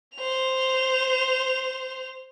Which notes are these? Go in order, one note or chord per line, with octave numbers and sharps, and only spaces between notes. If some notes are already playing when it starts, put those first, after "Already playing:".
C5 F7